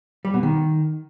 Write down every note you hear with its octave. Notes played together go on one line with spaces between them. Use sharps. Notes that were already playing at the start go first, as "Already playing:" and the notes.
G3
B2
D#3